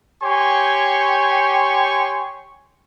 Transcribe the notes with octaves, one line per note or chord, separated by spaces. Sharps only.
G4 C#5 G5 G#5 C6 C#6